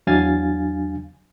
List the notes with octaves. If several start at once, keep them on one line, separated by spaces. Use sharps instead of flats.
E2 F#3 D4 F5 G#5 A6